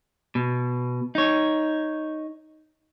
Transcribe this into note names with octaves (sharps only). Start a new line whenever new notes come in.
B2
D#4 C#5